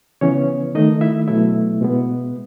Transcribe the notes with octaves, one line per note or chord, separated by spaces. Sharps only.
C#3 E3 B3 C#4 C#5
D#3 A3 D#4 D#5
E4 E5
B2 F#3 A3 E4 E5
B2 G#3 B3